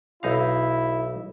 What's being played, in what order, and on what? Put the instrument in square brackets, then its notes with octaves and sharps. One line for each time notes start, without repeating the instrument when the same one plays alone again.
[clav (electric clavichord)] B1 D#4 F5 [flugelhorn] E4